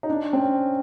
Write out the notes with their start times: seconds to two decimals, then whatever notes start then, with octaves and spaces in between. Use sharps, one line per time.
0.03 D#4
0.10 D4
0.33 C4
0.39 C#4